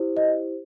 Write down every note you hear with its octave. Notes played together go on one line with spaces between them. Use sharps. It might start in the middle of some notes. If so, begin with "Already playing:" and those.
Already playing: E4 G4 C5
D#5